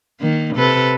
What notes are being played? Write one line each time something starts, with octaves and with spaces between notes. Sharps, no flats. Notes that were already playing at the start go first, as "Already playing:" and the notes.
D#3 A#3
C3 A4 B4